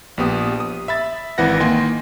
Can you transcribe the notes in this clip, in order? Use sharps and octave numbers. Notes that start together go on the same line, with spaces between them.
A#1 B3 G4 D#6
D#6
E5 B5 A6
G#1 E3 B4 F#5 A#6
D#3 A#3 G#5 C6